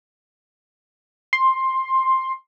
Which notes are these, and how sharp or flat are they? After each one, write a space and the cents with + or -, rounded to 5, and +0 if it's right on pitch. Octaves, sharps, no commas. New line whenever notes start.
C6 +10